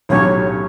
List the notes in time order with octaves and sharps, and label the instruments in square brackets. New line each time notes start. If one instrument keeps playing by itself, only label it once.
[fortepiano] B1 A2 F#3 C#4 G4 [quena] C#5